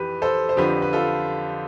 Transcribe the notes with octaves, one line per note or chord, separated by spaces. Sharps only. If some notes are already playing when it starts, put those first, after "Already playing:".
Already playing: F2 E3 G4 B4
A4 C5
C5
F2 D3 F3 G4 B4
B4
F4 A4